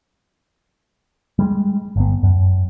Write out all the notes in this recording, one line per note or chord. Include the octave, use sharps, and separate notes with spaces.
G3 G#3
G1 B3
F#2